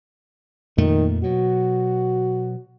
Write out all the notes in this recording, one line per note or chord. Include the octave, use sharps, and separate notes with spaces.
F2 A#2 D#3 A3
B2 F#3 F#4